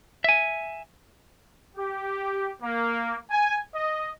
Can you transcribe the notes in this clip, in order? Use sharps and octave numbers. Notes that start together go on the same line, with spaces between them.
E5 G#5
G4
A#3
G#5
D#5